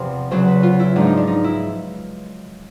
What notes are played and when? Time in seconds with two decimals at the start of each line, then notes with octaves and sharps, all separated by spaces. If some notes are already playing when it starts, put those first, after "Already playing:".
Already playing: E2 C3 F3 C5
0.31 E2 C#3 F#3 C5
0.48 B4
0.63 F4
0.80 E4
0.96 G#2 F3 D4
1.07 D#4
1.17 D4
1.28 D#4
1.44 E4